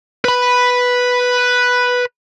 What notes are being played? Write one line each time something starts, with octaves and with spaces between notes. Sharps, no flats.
B4 B5